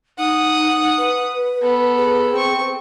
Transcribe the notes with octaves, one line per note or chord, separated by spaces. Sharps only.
D#4 F#5 D#6
B4
B3 A4
G#4
C4 C#6